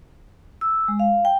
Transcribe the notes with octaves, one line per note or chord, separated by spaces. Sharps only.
E6
G#3
F5
G5